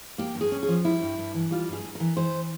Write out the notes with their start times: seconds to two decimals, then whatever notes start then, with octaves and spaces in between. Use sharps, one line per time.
0.18 A#3 G4
0.35 G2
0.41 G#4
0.52 C#4
0.63 G#4
0.68 F3
0.85 G3 E4
1.01 G2
1.18 G2
1.34 E3
1.51 G3 F4
1.68 G2 G#4
1.84 G2
1.95 E3 A#4
2.17 E3 C5